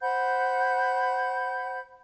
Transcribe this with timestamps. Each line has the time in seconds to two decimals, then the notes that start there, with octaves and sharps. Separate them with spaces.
0.01 C5 F#5 B5 G6